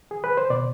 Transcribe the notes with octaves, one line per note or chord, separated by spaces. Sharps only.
G#4
B4
C5
B2 D5